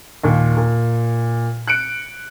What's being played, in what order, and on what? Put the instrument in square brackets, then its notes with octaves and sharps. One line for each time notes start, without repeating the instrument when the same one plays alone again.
[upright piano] D#2 A#2
A#2
F#6 C#7 D7